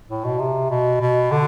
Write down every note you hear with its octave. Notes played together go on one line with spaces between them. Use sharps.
A2
B2
C3
B2
B2
D3